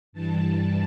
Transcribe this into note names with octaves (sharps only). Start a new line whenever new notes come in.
G2 E3 G3 A5